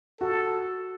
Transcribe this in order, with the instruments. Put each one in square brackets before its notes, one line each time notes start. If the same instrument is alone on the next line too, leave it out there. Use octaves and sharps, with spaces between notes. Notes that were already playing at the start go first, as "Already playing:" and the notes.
[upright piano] F#4 [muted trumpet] A4